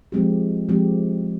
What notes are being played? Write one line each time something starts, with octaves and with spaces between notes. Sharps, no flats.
F3 G#3 C4 G4
F3 G#3 C4 G4